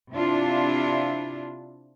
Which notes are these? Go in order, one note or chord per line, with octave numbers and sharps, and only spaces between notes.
C3 D4 E4 F4